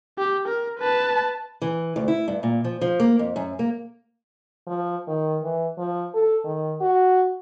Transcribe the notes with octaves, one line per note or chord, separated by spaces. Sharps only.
G4
A#4
B4 A5
E3
D2
E4
G2
A#2
F3
F3
A#3
F2
F#2
A#3
F3
D#3
E3
F3
A4
D#3
F#4